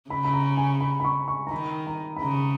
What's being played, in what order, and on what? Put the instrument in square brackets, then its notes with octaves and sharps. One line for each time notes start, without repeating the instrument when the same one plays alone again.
[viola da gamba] C#3 [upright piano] B5
[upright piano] B5
A#5
G#5
B5
B5
C#6
C#6
A#5
[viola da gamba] D#3 [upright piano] B5
[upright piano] A#5
B5
[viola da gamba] C#3 [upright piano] A#5